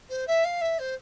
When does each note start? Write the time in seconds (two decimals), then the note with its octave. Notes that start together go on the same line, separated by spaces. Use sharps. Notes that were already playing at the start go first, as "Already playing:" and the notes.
0.09 C5
0.27 E5
0.44 F5
0.61 E5
0.78 C5